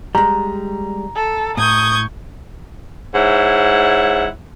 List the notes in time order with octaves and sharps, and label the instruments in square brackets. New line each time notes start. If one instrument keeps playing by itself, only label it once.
[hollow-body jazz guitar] G3 G#3 [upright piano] A#5
[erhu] A4
[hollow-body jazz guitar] A2 [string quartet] C#6 G6 G#6 [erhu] D#6
[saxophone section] G#2 E4 C#5 F#5